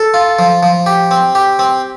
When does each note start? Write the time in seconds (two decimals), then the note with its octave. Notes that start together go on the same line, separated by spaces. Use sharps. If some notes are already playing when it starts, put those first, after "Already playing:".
Already playing: A4
0.14 F4
0.39 F3
0.63 F3
0.86 G4
1.11 C4
1.35 G4
1.59 C4